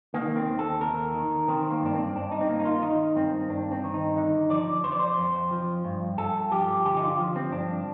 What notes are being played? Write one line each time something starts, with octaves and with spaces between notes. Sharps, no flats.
D#3 A#3
C4
D#2
A4
D#2 A#4
D#3
D#3 C4
A#3
G2 D4
C4
G2 D4
D#4
C4
D#3 A#3
D#4
F4
D#3 D#4
G2 C4
G2 D4
C4
D#3
D#4
D3 D#4
F3 D5
F2 C5
D5
C5
F2
F3
G2
G2 A4
F3 G4
D3 G4
D#4
F4
F3
C4
G2 D4